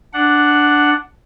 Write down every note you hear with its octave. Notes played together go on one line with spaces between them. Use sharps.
D4 F#5